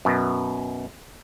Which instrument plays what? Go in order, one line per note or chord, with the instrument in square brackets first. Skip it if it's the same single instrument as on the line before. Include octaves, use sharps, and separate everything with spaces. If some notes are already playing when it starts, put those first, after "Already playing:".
[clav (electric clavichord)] F#2 B2